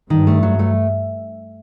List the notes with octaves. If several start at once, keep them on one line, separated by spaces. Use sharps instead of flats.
G2 D#3
A3
F#3
A3